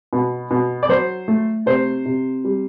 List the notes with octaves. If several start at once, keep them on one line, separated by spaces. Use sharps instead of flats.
B2
B2
D5
F#3 C5
A3
C3 C5
C3
G3